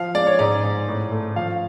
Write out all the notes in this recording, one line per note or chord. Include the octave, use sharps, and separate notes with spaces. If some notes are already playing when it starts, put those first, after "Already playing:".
Already playing: F3 F5
G#3 D5
C#5
G#2 D5
G#2
A2
A3
F3 F5